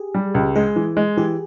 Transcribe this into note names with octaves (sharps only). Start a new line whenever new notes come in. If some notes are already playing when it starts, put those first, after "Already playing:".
Already playing: G4 G#4
G3
C#2
G#3 G#4
E3
G#3
E3 G4